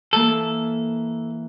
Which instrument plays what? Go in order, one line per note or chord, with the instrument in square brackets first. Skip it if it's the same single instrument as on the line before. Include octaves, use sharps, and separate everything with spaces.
[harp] E3 A#3 [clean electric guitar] A4